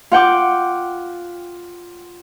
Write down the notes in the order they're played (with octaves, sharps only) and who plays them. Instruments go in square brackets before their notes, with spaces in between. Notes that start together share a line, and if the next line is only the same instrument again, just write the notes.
[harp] F4 F#5 G5 D6